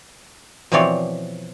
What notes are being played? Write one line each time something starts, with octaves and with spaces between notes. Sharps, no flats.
B2 E3 F3 C4 C#5 D5